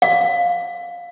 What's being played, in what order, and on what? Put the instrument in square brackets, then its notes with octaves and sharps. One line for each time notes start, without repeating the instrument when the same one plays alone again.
[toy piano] F5